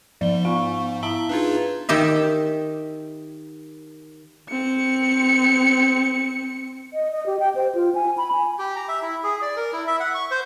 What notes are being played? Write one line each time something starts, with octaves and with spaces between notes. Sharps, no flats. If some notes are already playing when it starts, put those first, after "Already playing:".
G#2 F3 G7
B3 F5 C#6
E4 E5 F5 A5 A#5
D4 D#4 F4 G#4 B4
D#3 G4 D#5 E5
C4 C#7
D#5
D#5
G4
G5
C5
F4
G#5
B5
G#5
G4
A#5
E5
E4
G#4
D5
A#4
E4
E5
F#5
C#6
C5